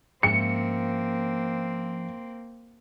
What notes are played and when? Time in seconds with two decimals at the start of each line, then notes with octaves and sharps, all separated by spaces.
0.23 G#2 F3 A#3 C4 C#4 E5 C#7